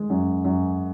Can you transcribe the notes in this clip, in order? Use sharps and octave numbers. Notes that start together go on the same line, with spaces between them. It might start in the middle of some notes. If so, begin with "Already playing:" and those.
Already playing: D#3 G#3
F#2
F#2